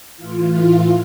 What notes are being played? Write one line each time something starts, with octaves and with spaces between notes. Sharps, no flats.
A2 E3 F4